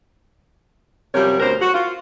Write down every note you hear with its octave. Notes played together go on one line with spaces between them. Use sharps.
F#2 C3 F3 G3 A#4 C#5
D2 B2 A#4 C5
F#4
F4